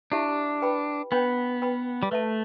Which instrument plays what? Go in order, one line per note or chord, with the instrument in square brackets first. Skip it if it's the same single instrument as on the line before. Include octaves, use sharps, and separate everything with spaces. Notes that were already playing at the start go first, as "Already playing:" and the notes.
[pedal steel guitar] D4 [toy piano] E4 G4 E5 A5
[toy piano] B4 G5 B5
[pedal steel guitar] B3 [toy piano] D4 B4 G5 B5
[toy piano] B4 G5 B5
[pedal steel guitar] G3
[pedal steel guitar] A3 [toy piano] B4 E5 A5